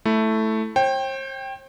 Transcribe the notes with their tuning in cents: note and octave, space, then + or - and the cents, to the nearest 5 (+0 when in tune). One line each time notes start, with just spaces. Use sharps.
A3 +0 E4 +0
C5 +45 G5 +0